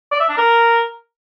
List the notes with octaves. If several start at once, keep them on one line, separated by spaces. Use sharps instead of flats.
D5
E5
D4
A#4